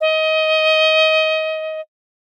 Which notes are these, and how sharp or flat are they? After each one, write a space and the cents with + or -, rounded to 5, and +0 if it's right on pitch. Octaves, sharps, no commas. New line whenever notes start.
D#5 +20